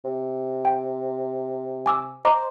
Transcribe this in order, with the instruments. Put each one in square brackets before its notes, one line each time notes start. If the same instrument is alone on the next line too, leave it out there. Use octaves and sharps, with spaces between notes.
[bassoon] C3
[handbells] G5
G#5 D6 E6
[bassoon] C5 [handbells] D#5 A#5 D6